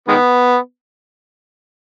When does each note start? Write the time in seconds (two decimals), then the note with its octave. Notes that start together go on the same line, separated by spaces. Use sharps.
0.08 D#3 G#3 B3